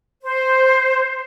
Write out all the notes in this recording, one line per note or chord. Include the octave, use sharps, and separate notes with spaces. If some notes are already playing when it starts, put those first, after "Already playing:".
C5